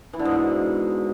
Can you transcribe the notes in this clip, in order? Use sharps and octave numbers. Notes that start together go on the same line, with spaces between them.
E3
D3
G#2
B2